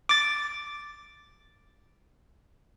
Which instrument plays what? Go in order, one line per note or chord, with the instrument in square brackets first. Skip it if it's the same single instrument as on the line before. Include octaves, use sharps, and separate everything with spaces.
[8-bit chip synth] D6 A6